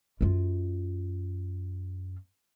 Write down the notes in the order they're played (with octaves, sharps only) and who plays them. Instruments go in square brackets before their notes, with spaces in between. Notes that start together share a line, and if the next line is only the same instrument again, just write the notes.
[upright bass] F#2 F4